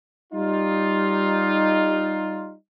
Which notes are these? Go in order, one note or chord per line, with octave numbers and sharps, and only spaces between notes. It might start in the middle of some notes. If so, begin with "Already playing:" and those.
G3 D#4 F4